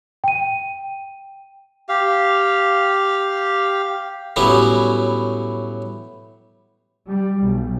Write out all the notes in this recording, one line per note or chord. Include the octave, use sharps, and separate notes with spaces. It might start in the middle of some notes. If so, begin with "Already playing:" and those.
G5 D#7
G4 F5
A2 F#3 G3 B3 C#4 E4
G3
B1